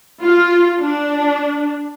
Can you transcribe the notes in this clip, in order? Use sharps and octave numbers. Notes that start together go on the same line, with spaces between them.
F4
D4